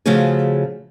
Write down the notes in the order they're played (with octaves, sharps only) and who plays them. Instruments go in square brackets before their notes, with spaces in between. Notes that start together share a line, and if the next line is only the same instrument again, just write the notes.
[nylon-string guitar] C#3 F3 A3 C#4 F#4 G#4